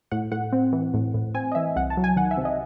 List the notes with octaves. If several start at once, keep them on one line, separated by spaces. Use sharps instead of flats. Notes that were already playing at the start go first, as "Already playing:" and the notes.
A2 F#5
A2 F#5
C4
E3
A2
A2
C4 G#5
D#5
E3 E5
C2 F#5
A5
F#3
G#5
D#3 F#5
E5
C3
D#5